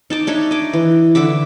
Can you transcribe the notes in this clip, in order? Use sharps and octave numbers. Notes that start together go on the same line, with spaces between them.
D#4 A5 D6
D4 D#4 C#5 E5
D#5 D6
E3
D3 E4 E5 D6